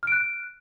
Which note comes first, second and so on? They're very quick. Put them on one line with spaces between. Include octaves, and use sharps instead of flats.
F6 D7 F#6